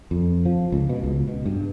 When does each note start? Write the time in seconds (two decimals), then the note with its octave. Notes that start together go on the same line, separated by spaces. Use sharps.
0.11 F2
0.45 F3
0.72 C#2
0.89 B2
1.03 C#2
1.28 B2
1.45 G2